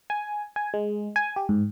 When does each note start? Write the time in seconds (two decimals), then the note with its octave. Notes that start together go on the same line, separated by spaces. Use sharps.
0.10 G#5
0.56 G#5
0.74 G#3
1.16 G#5
1.36 G4
1.49 G#2